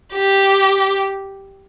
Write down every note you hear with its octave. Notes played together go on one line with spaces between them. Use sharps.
G4